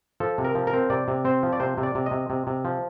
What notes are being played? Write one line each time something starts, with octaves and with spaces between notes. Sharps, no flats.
F3 A4
C3
A#4
F3
A#4
C4
C3 D5
C3
C4 C5
F3
D5
C3 C5
C3
D5
C3
D#5
C3
C3
C3
F3